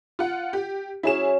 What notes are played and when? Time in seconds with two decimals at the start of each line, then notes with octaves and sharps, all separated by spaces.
0.19 F4 F#5
0.53 G4
1.03 F#3 C#4 E4 G#4 E7